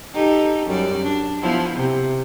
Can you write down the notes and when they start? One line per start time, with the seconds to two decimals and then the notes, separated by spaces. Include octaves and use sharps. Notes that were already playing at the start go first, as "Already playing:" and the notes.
0.13 D#4 G4 A4
0.66 F#2 G3 D5
1.03 D4
1.42 F3 B3 E4
1.75 C3